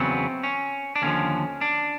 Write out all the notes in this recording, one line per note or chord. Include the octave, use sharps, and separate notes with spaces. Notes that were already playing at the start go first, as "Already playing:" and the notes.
Already playing: E2 C#3 F#3 B3 C4
C#4
D4
D#2 D3 F3 C#4
D4